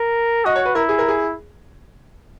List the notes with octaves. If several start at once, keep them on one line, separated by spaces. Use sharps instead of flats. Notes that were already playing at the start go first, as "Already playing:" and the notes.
Already playing: A#4
F#4 D#5
C#5
B4
E4 A#4
G#4
A#4
G#4